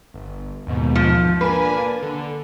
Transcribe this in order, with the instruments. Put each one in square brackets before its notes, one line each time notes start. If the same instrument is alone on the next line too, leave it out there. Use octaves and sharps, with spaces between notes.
[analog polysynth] G1
D#2 G#2 B2
[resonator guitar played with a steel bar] F3
[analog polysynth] A#3 D4 G#5 [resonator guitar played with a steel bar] B4
[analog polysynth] D3